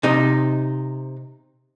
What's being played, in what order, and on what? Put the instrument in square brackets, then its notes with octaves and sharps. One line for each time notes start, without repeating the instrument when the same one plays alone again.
[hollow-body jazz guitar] C3 D#4 D#5